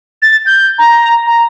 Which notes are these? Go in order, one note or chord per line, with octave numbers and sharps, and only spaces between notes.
A6
G6
A#5
A#5